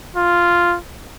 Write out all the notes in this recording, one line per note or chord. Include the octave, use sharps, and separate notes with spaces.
F4